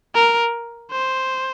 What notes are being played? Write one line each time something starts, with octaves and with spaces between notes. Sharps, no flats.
A#4
C5